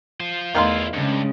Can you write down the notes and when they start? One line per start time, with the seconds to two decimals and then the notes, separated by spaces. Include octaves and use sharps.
0.20 F4 C5
0.55 E2 D#3 A3 E4 F4 F5 C6
0.94 G2 C#3 G#3